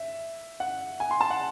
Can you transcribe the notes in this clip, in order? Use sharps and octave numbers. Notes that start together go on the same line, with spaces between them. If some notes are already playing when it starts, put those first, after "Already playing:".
Already playing: E5
F#5
G#5
C6
A5
F#5